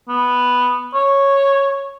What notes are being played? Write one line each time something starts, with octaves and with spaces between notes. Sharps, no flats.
B3
C#5